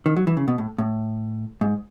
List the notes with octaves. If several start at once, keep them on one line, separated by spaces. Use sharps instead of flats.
D#3
F#3
E3
C#3
B2
A2
A2
G#2